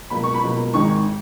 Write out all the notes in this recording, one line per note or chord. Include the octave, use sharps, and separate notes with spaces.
C#2 B2 F#3 A#3 B5
C#6
B5
C#2 B2 F#3 A#3
G#1 G#2 D#3 G#3 C#6